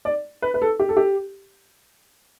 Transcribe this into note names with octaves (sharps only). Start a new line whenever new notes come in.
D5
B4
B4
A4
G4
A4
G4